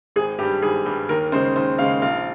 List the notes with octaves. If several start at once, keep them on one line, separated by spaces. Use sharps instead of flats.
G#1 G#4
G2 G3 G4
G#1 G#4
G2 G3
D#2 A#4
C#3 G#3 C5
D#2 C5
C#3 G#3 F5
A#1 F5